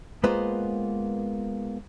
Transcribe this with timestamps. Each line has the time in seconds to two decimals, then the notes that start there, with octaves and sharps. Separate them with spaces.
0.24 G#3 A#3 B3 F4 B4 C5